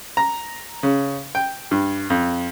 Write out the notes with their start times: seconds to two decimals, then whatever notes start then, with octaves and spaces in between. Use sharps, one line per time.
0.17 A#5
0.83 C#3
1.35 G5
1.71 G2
2.10 F2